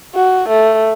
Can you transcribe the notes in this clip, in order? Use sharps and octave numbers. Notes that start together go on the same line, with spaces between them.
F#4
A3